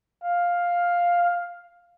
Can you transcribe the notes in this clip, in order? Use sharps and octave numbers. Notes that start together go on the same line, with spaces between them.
F5